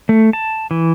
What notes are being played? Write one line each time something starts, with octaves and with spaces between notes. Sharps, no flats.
A3
A5
E3